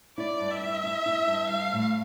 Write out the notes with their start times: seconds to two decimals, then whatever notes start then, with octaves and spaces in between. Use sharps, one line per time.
0.18 E4 D5
0.40 G2
0.51 E5
0.61 E4
0.83 E4
1.06 E4
1.28 G2
1.49 G3 F5
1.72 A2